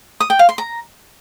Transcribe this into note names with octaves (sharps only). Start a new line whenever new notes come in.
D#6
G5
F5
C6
A#5